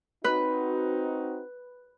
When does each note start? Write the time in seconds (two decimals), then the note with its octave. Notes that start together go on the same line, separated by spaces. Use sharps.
0.24 C4 D#4 F#4 B4